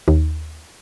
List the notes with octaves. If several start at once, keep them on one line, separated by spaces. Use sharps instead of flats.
D#2